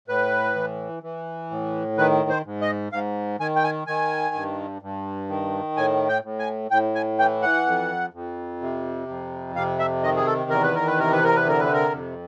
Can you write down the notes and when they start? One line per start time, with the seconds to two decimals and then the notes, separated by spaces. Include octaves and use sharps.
0.08 A2 B4
0.55 E3
1.03 E3
1.51 A2
1.98 D#3 B4
2.29 C5
2.45 G#2
2.61 D#5
2.92 G#2 F5
3.40 D#3 G#5
3.56 G5
3.64 G#5
3.87 D#3 G#5
4.35 G2
4.82 G2
5.29 D#3
5.77 A2 G#5
6.09 G5
6.24 A2
6.39 G#5
6.71 A2 G5
6.95 G#5
7.19 E3 G5
7.42 F#5
7.66 F2
8.13 F2
8.61 C3
9.08 F2
9.56 C3 F5
9.79 E5
10.03 D#3 D#5
10.16 G#4
10.26 A4
10.50 E2 A#4
10.63 B4
10.75 A#4
10.87 B4
10.97 C3 A#4
11.12 B4
11.24 A#4
11.36 B4
11.45 D3 A#4
11.60 B4
11.73 A#4
11.92 F2